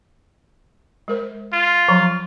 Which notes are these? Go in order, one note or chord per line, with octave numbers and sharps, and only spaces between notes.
G#3 A#4 C5
F4
F3 F#3 A#5